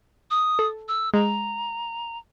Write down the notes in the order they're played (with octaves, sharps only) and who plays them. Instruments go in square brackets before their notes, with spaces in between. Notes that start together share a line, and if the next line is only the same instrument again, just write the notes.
[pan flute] D#6
[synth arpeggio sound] A4
[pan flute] E6
[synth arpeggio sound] G#3 [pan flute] A#5